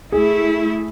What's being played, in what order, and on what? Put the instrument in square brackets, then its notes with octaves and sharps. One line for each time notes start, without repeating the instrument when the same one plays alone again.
[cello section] A3 E4 [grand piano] G#4